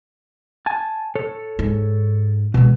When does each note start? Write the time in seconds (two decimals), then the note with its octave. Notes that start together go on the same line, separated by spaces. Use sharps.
0.66 G#5 A5
1.15 A4 C#5
1.59 G#2
2.54 B2 E3 G#3